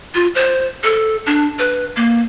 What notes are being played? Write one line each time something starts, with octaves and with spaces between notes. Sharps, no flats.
F4
C5
A4
D4
B4
A#3